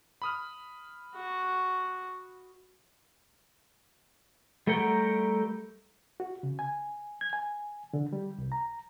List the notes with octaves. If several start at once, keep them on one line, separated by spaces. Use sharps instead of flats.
B5 D#6 F6
F#4
G3 A3 A#4 F#5 G5
F#4
C#3
G#5
G#6
G#5
D3
G3
C2
A#5